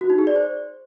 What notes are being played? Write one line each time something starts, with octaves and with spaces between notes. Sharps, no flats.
F#4
D#4
G#4
D5
C5